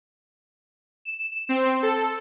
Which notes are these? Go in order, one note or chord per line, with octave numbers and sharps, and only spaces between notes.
E7
C4
A4